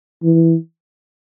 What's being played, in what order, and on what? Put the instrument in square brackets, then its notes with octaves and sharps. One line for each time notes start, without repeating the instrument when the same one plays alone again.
[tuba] E3